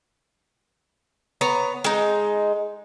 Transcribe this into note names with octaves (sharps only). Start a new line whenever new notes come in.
B3 C#5 A#5
G#3 D#4